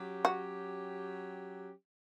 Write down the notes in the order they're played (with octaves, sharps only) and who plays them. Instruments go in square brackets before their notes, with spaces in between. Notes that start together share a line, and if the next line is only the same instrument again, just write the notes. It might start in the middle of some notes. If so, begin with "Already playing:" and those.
Already playing: [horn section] F#3 C#4 G4
[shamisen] F#4